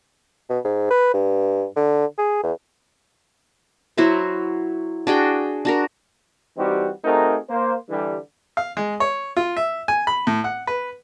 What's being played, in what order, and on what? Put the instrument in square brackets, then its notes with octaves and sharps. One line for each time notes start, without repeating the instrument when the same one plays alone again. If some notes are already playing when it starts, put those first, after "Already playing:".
[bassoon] B2
G#2
B4
G2
D3
G#4
E2
[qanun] F#3 E4 F#4 C5
D4 F#4 G#4 G5
D4 F#4 A#4
[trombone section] E3 G3 C4 D#4 F#4 G4
A3 C4 D#4 F#4 G#4 A#4
A#3 C5
D3 E3 G3
[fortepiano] F5
G#3
C#5
F4
E5
G#5
B5
A2
F#5
B4